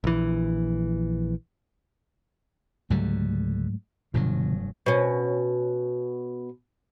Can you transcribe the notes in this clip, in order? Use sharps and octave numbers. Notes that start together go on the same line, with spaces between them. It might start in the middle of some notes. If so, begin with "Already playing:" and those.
A#1 E3
C#2 G#2 D3 F#3 G3 A3
F1 G2 B2 D3 F3 F#3
B2 C#4